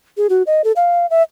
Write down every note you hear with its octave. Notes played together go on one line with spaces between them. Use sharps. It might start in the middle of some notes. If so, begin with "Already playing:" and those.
G#4
F#4
D#5
A4
F5
E5